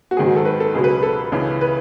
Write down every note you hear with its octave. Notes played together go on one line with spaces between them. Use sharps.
F#4
G#2 D#3 F#3 G#4
F#4
A4
B4
A4
C#2 B2 F#3 G#4
B4
A4
C#2 C#3 E3
B4